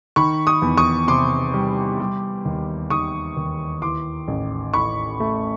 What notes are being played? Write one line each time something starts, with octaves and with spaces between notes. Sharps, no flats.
D#3 B5 C#6
C#6 D#6
E2
C#6 D#6
C3 C6 D6
G3
G3
D#2
D#3 C#6 D#6
D#2
E3 C6 D6
A1
A2 B5 C#6
A3